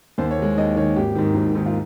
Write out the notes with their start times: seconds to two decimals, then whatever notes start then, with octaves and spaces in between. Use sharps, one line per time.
0.18 D#2 C5
0.31 C#5
0.38 D#3 G#3
0.58 D#2 D#5
0.76 D#3 C#5
0.80 G#3
0.96 G#1 G4
1.15 G#2 D#3
1.35 G#1
1.55 G#2 D#3
1.66 F4